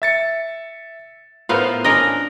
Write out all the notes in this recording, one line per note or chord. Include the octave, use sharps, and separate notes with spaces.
E5 A6 C#7
A2 B3 F4 A#4 C5 F5
C#4 D4 A#4 D#5